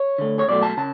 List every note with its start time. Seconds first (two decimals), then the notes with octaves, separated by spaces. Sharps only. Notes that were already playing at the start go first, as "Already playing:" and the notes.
Already playing: C#5
0.18 D3 A3
0.39 C#5
0.48 B2 F#3 A3 D5
0.63 A5
0.77 C#3 A5